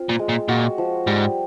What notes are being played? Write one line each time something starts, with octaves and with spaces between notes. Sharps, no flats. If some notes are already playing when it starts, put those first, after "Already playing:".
Already playing: C4 F4
A#2
G#3
A#2
A#2 F#4
F3
G#2 G3